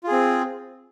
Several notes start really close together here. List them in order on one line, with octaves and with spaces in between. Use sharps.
F4 G#4 C4